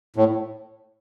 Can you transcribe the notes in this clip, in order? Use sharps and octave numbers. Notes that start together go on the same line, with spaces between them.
A2